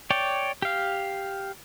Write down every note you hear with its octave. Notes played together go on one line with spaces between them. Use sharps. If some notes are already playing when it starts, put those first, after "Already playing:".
C#5 D5 G5
G4 F5